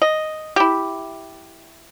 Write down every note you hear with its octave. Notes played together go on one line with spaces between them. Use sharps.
D#5
E4 G4